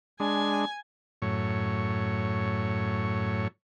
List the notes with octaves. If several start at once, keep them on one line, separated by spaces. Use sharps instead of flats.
G#3 D4 G#5
F#2 A2 C#5